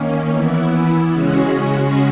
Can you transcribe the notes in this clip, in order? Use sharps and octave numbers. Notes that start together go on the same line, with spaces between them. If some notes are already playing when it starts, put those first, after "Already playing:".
Already playing: D#3 A#3 C#4
E3 B3 E4
C#3 G#3 C#4 F#4